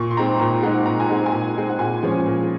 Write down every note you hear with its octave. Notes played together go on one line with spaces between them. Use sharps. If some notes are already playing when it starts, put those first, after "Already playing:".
Already playing: A#2 C#6
C6
G#3 C4 D#4 A#5
A#2 A#5
G#3 C4 D#4 F#5
A#2 A#5
G#5
G#3 C4 D#4 F#5
G#5
A#2
G#3 C4 D#4
F#5
A#2 G#5
F3 G#3 C#4
A#2